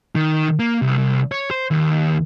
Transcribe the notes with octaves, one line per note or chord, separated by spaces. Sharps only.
D#3
A#3
C2
C2
C#5
C5
D#2